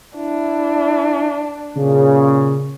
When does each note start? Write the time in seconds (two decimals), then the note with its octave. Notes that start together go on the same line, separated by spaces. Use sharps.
0.17 D4 E4
1.77 A#2 C#3